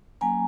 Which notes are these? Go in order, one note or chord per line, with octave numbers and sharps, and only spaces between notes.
F#3 A#3 C#4 G#5 A#5